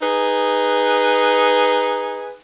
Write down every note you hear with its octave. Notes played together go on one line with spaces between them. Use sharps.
D#4 G#4 B4